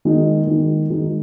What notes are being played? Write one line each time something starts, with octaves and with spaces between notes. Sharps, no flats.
D#3 G#3 D#4
D#3 G#3 D#4
D#3 G#3 D#4